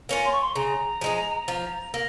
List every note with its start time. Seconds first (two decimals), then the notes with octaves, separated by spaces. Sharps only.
0.09 A#3 C#4 F4
0.24 C6
0.32 C#6
0.41 C6
0.55 C#3 A#5
1.01 F3 G#3 D#4
1.48 F3
1.94 A#3